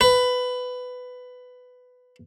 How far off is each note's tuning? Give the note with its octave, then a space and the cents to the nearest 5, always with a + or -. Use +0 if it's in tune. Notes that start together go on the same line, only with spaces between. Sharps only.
B4 +15